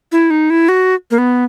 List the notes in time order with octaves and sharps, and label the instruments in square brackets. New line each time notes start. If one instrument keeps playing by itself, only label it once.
[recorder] E4
D#4
E4
F#4
A#3
B3